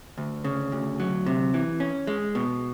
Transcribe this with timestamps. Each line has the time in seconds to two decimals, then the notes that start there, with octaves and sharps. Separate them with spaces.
0.18 D2
0.44 C#3
0.72 D2
1.00 F#3
1.26 C3
1.54 E3
1.80 C#4
2.07 G#3
2.35 B2